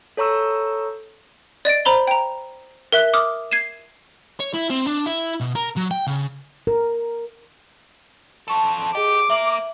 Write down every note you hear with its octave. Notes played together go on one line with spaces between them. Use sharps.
A4 C#5 A#5 C#6 E6
D5 D#5 A6 D7
C5 A#5 B5 G7
G5 A#5
A#4 E5 F#6 G7
D6 D#6 F6
G#6 C7 D#7 E7
C#5
E4
C4
D4
E4
B2
A#4
F#3
G5
C#3
A#4
F3 A4 A5 C#6
G4 G#4 D#5 D6
A#3 E5 F#7